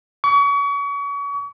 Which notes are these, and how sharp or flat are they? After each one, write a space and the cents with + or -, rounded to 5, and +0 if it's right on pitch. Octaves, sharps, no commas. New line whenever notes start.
C#6 +35